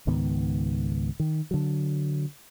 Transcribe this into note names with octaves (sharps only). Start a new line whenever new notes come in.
C#2 G#2 D#3 B3
D#3
D3 F#3